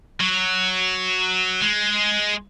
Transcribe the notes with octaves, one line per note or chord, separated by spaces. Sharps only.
F#3
G#3